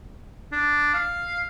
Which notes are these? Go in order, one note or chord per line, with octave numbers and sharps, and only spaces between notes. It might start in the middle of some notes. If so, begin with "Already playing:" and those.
D4
F5